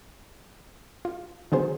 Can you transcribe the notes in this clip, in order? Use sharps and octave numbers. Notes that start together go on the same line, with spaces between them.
F4
D3 D#3 F#3 B3 G#4 C5